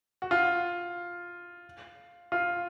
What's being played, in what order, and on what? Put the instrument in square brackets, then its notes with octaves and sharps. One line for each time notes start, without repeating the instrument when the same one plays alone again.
[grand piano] F#4
F4
F4